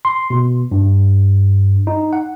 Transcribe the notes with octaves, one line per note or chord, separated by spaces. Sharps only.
C6
B2
G2
D#4
F#5